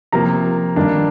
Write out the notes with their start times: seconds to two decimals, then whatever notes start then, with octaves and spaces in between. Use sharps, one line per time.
0.12 C3 F3 A#3 A#5
0.76 G2 D#3 A#3 D4